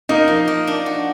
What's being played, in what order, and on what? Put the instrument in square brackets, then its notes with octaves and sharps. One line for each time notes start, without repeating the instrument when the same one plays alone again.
[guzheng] A#3 [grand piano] D#4
[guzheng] F3
A#3
D4
F#4